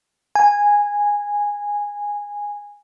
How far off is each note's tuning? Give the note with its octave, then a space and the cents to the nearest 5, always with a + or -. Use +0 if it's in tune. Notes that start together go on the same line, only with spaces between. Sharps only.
G#5 -10